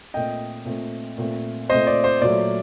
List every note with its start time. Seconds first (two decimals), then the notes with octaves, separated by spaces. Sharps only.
0.14 A#2 A3 C4 D#5 G5
0.65 A#2 A3 C4
1.18 A#2 A3 C4
1.70 A#2 A3 C4 C5 D#5
1.87 D5
2.04 C5
2.21 A#2 F#3 A3 D5